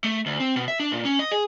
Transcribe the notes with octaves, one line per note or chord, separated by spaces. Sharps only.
A3
D2
C4
B2
E5
D4
A#2
C#4
D#5
G#4